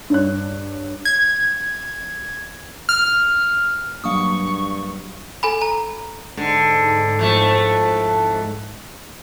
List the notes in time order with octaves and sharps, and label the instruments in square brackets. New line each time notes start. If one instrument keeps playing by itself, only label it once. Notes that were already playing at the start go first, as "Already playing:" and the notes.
[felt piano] G2 C#5 F#6
[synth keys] G#6
F6
[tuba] G2 [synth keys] F#3 A#3 D4 [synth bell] F5 D#6 [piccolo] C#6
[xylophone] A4 G#5 B5
A#5
[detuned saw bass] G#2 [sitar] D3
[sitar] F2 A2 A3